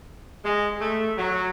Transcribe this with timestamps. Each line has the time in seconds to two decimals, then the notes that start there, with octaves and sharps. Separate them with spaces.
0.43 G#3
0.81 A3
1.17 F#3